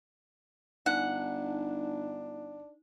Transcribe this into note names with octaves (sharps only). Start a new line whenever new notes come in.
G1 D4 D#4 F#5